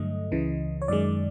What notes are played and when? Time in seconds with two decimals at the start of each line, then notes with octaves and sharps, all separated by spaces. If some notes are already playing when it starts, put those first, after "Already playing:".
Already playing: G2 D3 F#3 A3 D#5
0.31 C#2 C#3 E3
0.82 C#5
0.88 F#2 D#3 G#3 D5